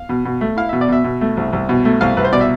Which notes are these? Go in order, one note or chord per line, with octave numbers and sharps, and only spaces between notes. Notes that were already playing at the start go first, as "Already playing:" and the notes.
Already playing: F5
B2
B2
A3
E4 F5
B2 E5
D5
B2 E5
B2
A3
C2
C2
B2
A3
C2 F5
C2 B4
C5
B2 D5
E5